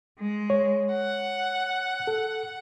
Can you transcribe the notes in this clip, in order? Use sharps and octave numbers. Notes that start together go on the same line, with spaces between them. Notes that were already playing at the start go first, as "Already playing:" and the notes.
G#3
C#5
F#5
A4